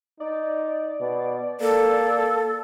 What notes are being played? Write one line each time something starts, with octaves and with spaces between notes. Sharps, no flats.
D#4 D5
B2
A#3 A4